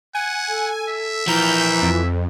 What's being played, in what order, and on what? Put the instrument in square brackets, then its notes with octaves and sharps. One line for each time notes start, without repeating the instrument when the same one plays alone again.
[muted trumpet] F#5 [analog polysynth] G#5
[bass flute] A4
[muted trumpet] E5
[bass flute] E3 [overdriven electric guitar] F3 A#4 [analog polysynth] G6
[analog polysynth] F2